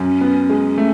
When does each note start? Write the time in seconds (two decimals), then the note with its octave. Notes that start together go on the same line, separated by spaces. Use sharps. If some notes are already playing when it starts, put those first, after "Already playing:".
Already playing: F#2 C#4
0.21 B3
0.50 G#3
0.78 A3